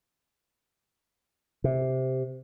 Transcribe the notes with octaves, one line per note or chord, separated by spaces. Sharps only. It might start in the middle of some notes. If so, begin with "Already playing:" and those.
C3